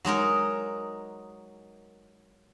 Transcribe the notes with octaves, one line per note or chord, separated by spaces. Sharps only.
F#3 G#3 D#4 A#4